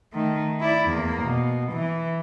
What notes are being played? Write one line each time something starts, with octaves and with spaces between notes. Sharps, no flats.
D#3 A3
E4 D5
E2 A#3
B2
E3